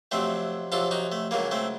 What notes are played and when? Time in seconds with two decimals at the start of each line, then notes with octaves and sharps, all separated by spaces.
0.11 F2 C3 F#3 A3 C4
0.72 F2 C3 F#3 F4 A4
0.91 D#4 F#4
1.12 A3
1.31 C#2 C#3 F#3 A#3
1.51 A3 C4